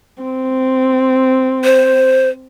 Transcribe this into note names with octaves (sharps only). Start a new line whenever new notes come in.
C4
C5